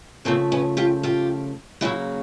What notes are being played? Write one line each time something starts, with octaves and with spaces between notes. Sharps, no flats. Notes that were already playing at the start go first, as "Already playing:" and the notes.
C#3 F3 A3 A#3 C4
B3 C#4
F4 G4
F4 G4
C#3 F#3 A#3 E4 F#4